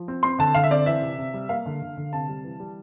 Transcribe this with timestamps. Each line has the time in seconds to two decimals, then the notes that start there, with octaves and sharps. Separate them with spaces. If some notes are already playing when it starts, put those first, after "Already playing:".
Already playing: F3
0.08 C4
0.23 C4 C6
0.39 D3 A5
0.54 D3 F5
0.63 E5
0.71 C4 D5
0.86 E3 E5
1.02 C3
1.18 C3
1.34 G3
1.49 A#3 F5
1.66 D3
1.82 D3
1.97 D3
2.13 C3 A5
2.29 G3
2.44 E3
2.60 G3